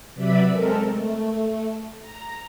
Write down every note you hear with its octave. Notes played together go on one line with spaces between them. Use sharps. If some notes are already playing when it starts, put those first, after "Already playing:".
C3 F#3 B4 D5 E5 B5
G#3 C4 A4 A#4
A3
A#5